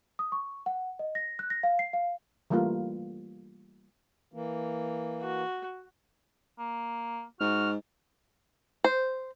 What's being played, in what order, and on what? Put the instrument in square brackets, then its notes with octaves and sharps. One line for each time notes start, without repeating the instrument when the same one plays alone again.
[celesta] D#6
C#6
F#5
D#5
A#6
F#6
A#6
F5
C7
F5
[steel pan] E3 G3 A3 A#3 F4
[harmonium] E3 A#3
[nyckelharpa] F#4
[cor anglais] A#3
[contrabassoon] G#2 [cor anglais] F#4 [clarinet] F6
[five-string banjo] C5